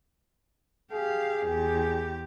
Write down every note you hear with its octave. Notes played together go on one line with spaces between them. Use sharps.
G4 G#4 F5
E2 G4